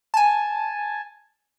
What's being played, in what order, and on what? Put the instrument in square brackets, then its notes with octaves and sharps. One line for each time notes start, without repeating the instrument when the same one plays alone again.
[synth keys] G#5 A5